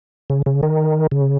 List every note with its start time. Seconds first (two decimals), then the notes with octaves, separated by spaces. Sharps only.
0.30 C#3
0.46 C#3
0.63 D#3
1.12 C#3